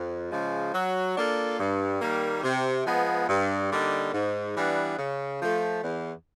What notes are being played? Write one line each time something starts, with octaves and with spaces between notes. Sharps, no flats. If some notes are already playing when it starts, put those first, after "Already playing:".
Already playing: F2
C#3 F3 G#3
F#3
A#3 D4 F4 A4
G2
D#3 G3 A#3
C3
F3 G#3 B3
G2
D3 G3 A#3 D#4
G#2
E3 G3 B3 D4
C#3
F3 A3
E2